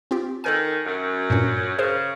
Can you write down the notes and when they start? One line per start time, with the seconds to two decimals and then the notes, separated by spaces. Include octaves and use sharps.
0.11 C4 F4 G4
0.44 D#3 A4 A#4 G#5
0.86 F#2
1.30 G2 A#2 C#4
1.79 C#3 G#4 A#4 C5